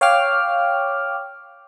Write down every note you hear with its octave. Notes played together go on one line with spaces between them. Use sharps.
C#5 F5 G5 D6 F6